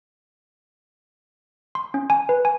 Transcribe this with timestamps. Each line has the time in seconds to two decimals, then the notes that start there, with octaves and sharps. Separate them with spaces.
1.75 C6
1.94 C#4
2.10 G#5
2.29 B4
2.45 G#5